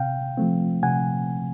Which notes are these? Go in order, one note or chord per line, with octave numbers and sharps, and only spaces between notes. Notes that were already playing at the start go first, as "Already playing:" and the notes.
Already playing: C3 F5 G5
F3 A3 C4
C3 F#5 G#5